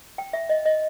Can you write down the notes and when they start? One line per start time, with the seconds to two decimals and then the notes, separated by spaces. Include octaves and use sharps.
0.18 G5
0.33 E5
0.49 D#5
0.66 D#5